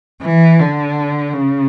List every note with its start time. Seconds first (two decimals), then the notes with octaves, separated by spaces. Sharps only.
0.22 E3
0.59 D3
1.33 C#3